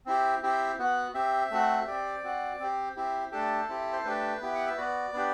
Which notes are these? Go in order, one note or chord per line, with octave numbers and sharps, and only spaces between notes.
C4 E4 G4
C4 E4 G4
B3 F#4
C4 G4 E5
A3 C4 F#4
C4 G4 D5
C4 F#4
C4 G4
C4 E4 G4
A3 D4 G4 A4
C4 E4 G4
C5
A3 D4 G4 B4
B3 E4 G4
F#5
E5
B3 F#4 D5
B3 D4 G4